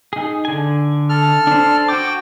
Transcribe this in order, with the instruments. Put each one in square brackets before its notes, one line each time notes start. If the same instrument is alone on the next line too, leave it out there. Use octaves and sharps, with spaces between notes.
[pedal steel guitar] D#4 G#4
D3 G#5
[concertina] A4 F6
[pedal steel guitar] D4 C5
[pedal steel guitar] F#4 D6 [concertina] G5